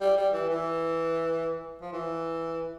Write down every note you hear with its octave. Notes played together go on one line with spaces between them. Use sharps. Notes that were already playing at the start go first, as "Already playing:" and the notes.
G3
G3
E3
E3
F3
E3